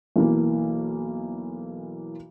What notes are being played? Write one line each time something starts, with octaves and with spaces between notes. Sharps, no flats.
B1 E3 A#3